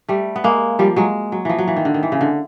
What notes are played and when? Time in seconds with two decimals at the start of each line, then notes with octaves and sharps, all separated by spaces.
0.08 G3 A3
0.36 B3
0.44 G#3 A#3
0.79 F3 G3
0.96 F#3 G#3
1.32 F#3
1.45 E3 F3
1.59 F#3
1.68 E3
1.76 D#3
1.85 D3
1.94 D#3
2.03 E3
2.12 C#3
2.21 D3